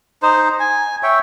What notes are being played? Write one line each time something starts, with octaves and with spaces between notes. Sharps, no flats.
D#4 C5
G#5
C#5 E5 G5